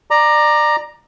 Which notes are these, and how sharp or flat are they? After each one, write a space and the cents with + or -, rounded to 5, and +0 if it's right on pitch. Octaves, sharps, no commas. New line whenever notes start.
D5 +20 A#5 +0